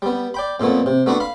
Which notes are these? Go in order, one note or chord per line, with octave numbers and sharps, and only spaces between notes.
G3 B3
D5 G5 B5
F2 A#2 A3 B3
C3
A3 B3 D4 F#4 B4 F#5
F5 B5